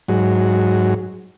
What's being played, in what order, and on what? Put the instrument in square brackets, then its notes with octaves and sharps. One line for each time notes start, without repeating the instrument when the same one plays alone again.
[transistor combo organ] G#2 F#3